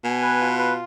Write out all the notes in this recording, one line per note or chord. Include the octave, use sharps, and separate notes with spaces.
B2 G#5
B4
F4
B4